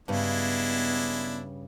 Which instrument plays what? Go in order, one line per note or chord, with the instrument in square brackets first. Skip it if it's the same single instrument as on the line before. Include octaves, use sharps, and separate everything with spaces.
[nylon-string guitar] G2 C#3 [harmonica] G#3 D4 E4 [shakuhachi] B3